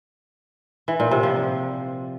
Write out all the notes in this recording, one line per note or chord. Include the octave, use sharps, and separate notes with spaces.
E3
A#2
C3
F3